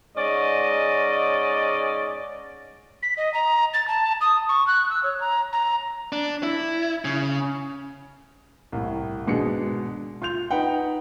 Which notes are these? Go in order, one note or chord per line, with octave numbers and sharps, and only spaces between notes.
G#2 C#4 D5 D#5
B6
D#5
A#5
A6
A5
D#6
C#6
F#6
E6
C#5
A#5
A#5
D4
E4
C#3
C2 A2
G#1 B2 G#3 D4 C#7
F4 C6 G6 F7
D#4 B4 F#5 G5